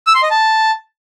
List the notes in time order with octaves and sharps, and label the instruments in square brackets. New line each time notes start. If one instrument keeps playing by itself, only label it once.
[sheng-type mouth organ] E6
C6
D#5
A5